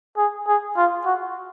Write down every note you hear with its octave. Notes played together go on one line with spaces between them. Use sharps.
G#4
G#4
F4
F#4